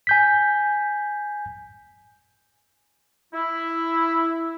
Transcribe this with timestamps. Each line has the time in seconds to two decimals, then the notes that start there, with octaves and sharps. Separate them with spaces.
0.07 G#5 G6 B6
3.34 E4